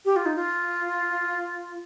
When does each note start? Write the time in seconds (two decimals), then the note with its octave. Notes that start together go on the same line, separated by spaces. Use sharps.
0.05 G4
0.16 F4
0.26 D#4
0.36 F4